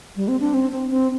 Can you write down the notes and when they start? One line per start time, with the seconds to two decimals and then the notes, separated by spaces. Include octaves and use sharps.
0.16 G3
0.28 C4
0.40 D4
0.54 C4
0.72 C4
0.90 C4